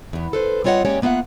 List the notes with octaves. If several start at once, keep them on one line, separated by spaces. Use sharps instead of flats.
E2 B3
A4 B4 C5
G3 C4 F4 C#5 D#5 F#5
G#3 A#3 C#4 G4 C#5 D5
A#3 B3 F4 E5 F#5